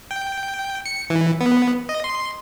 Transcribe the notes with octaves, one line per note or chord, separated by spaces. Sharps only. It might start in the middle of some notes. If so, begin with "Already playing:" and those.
G5
C#7
E3
B3
D#5
C6